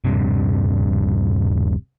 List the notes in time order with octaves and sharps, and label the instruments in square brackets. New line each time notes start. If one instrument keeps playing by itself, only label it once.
[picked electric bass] D#1 G2 C3